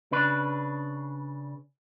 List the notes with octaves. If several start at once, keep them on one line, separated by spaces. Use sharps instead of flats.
C#3 D4 B4